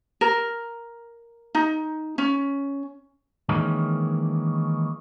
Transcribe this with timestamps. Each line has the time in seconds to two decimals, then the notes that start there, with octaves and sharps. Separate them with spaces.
0.21 A#4
1.55 D#4
2.18 C#4
3.49 D#3 E3 G#3 A#3 C#4